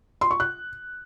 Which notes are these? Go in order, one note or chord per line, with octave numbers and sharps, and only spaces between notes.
C6
C#6
F#6